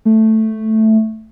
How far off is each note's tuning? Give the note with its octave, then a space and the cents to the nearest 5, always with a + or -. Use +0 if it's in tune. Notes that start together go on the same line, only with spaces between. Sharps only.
A3 +0